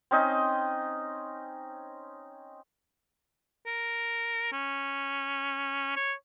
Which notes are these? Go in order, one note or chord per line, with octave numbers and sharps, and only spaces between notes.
C4 C#4 D#4 D#5
A#4
C#4
C#5